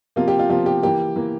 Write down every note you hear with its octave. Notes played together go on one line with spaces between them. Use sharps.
C3 F3 A#3 F4
G4
F4
C3 F3 A#3 F4
G4
E3 A#3 G4
E3 A#3